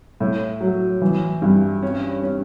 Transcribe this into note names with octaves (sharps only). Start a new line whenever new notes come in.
A2
F#3
E3
G2
C#4
C#4